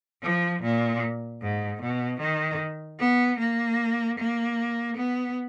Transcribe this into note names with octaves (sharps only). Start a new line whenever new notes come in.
F3
A#2
G#2
B2
D#3
B3
A#3
A#3
B3